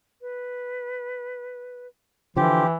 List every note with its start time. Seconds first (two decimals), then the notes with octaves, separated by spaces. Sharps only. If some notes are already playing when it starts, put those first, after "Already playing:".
0.21 B4
2.37 D3 E3 F3 G4 C6